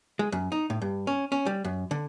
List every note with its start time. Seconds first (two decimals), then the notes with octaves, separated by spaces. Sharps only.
0.19 G#3
0.32 F#2
0.52 D#4
0.70 A2
0.82 G2
1.07 C#4
1.32 C#4
1.46 G3
1.65 F#2
1.91 D3